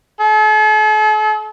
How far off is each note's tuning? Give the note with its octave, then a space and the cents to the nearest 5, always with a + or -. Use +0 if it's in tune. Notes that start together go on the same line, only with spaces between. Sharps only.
A4 -45